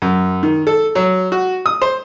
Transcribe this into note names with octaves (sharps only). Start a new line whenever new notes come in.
F#2
D#3
A4
F#3
F#4
D#6
C5